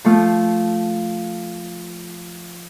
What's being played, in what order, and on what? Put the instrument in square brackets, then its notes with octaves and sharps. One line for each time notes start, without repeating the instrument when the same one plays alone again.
[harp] F3 A3 F4